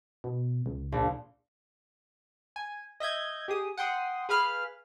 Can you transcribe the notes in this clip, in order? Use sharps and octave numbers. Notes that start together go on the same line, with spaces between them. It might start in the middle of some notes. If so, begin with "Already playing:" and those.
B2
C#2
A#1
G#5
D#5 E5 G6 G#6
G4 G#4 D#6
F#5 G5 C6 D#6
G#4 B4 F5 B5 F6